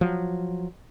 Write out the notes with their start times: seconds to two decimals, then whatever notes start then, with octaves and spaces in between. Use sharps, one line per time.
0.01 F3 F#3